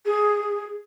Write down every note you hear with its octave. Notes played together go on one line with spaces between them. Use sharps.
G#4